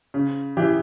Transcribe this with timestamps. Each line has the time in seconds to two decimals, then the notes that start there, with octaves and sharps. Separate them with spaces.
0.14 C#3
0.57 E3 G4